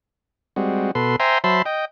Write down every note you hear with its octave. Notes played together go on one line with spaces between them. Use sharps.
G3 G#3 C4 F#4
B2 A4 B4 C6
C5 E5 G5 G#5 A#5 C6
F#3 C5 E5 A5 B5 C6
D#5 G5